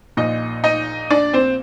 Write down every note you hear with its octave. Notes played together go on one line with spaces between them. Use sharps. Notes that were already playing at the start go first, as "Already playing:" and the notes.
A#1 A#2 D#4 D#5
D#4 D#5
D4 D5
C4 C5